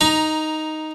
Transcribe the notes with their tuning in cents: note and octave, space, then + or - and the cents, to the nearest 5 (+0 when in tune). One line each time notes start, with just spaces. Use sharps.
D#4 +0 A#5 +15